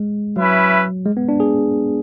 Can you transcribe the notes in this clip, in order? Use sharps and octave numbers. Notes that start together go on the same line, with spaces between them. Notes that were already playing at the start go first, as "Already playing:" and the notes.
Already playing: G#3
F#3 C#4 E4 B4 E5
G#3
B3
D4
G#4